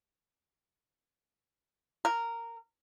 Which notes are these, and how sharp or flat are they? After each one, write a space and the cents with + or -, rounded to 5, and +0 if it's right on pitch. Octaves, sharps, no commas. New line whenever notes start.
A#4 -10